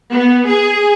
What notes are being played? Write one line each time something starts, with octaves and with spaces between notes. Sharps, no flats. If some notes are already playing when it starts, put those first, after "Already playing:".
B3
G#4